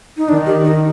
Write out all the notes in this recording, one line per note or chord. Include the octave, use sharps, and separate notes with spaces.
D#4
D#3 D4
G4
D#4